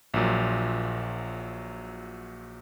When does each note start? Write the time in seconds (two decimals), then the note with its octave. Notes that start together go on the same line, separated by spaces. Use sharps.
0.14 A#1 A#2 F#3